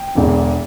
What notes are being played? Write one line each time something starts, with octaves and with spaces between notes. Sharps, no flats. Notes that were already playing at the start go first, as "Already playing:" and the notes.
Already playing: G5
E1 E2 D3